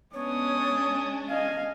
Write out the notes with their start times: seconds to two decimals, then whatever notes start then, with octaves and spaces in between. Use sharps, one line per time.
0.14 G#3 B3 C#4 D4 C#5 D#6
1.29 D#5 F5 G#5